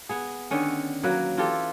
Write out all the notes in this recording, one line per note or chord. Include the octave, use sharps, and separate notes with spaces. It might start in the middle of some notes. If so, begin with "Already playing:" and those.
B3 G#4
D3 D#3 C#4
F#3 A#3 B4
E3 F4 G4 A4